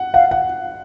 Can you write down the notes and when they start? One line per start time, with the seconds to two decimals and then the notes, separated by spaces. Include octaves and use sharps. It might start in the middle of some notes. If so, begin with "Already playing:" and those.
Already playing: F#5
0.14 F5 F#5
0.31 F#5